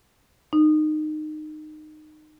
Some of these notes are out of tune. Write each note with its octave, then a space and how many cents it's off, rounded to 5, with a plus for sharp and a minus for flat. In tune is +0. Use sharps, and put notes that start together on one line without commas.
D#4 -20